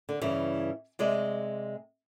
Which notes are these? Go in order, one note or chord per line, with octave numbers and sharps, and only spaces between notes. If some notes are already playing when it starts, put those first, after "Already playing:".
D3
G2 C#3 E3
C3 G#3 D5